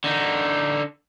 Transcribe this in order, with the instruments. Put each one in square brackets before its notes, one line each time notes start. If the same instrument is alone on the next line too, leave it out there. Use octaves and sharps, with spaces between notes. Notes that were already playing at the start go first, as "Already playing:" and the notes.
[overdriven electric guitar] D3 D#4